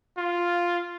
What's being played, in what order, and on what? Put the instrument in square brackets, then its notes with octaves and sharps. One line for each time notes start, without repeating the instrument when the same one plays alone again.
[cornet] F4